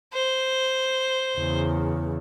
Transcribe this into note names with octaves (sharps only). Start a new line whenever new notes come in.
C5
E2 C#3